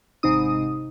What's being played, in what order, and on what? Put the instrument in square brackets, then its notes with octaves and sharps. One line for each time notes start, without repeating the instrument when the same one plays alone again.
[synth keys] G#1 C3 D#4 D#6